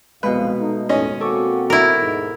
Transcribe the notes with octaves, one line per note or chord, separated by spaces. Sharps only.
C2 F2 B2 G#3 B4 F5
A3 D#4
D#2 A2 C#4 D#5
A#3 C4 F#4 A4 C#6 D6
E4 A#4
D#2 G#2